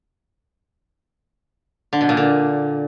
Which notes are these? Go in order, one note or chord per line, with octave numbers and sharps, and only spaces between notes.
D3
B2
A#2
D3